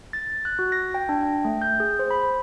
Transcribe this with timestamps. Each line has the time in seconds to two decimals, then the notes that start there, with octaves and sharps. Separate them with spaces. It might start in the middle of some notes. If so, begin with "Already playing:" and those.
0.13 A6
0.45 F#6
0.59 F#4
0.72 A#6
0.94 G5
1.09 D4
1.23 G5
1.45 A3
1.62 G6
1.80 G#4
1.99 C5
2.11 B5